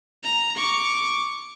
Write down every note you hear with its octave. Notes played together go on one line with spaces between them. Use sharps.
A#5
C#6 D6